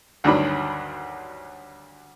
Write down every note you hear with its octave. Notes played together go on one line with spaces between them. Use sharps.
D2 G2 D3 D#3 F#3 B5